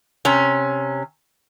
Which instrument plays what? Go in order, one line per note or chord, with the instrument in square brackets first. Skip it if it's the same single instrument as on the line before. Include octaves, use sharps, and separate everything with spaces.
[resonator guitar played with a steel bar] C3 C#4